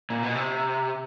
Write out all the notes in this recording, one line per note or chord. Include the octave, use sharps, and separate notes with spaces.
A#2
B2
C3